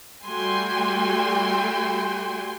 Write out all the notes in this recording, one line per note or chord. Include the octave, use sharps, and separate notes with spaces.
G3 A3 F#4 G5 G#5 C6